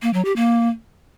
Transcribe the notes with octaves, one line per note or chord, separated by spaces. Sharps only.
A#3
F#3
G4
A#3